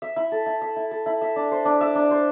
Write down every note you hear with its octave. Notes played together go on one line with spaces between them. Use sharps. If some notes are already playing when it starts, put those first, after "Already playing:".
E5
E4
A4
E4
E5
E4
A4
E4
E5
D4
C5
D4
E5
D4
C5